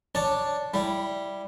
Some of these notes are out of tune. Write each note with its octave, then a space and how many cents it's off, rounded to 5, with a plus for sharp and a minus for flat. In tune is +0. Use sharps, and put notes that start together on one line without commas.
D4 +0 C#5 +0 A5 +0
G3 +0 E4 +0